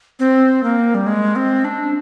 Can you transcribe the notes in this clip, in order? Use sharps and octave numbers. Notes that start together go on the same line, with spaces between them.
C4
A#3
G3
G#3
C4
D4